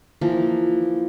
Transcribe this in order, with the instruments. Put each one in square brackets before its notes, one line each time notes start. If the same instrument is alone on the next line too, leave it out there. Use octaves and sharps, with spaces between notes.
[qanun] E3 F3 A#3